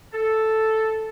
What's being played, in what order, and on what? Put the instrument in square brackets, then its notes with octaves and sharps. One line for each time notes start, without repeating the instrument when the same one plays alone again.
[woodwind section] A4